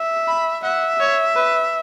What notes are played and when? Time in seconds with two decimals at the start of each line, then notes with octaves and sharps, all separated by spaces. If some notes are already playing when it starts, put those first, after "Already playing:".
Already playing: E5
0.28 B5
0.64 E5 F#5
1.00 C#5
1.36 B4